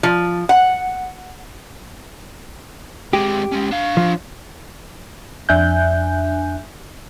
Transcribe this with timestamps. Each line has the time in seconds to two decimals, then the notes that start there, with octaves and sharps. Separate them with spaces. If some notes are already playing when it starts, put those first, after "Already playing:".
0.03 F3
0.49 F#5
3.13 G#3 C4 G4
3.52 G#3 C#4
3.71 D4 F5
3.97 F3
5.49 F2 D4 E5 G#5 F#6 G6